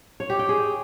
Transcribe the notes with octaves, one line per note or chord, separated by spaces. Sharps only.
C#5
G4
G5
G#4